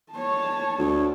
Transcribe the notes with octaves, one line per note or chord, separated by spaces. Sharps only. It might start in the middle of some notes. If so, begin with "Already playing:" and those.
C#5 A5
D2